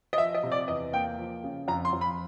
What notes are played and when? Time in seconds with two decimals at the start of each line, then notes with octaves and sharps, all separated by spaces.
0.13 D#5
0.18 F3 E5
0.35 D#5
0.43 C3
0.52 D5
0.68 E2 D#5
0.93 A#3 G5
1.18 F3
1.44 C#3
1.68 F2 A#5
1.85 C6
1.93 F2
2.01 B5